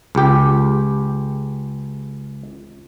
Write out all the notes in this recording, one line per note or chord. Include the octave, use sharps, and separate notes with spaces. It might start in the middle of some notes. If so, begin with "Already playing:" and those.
C#2 G4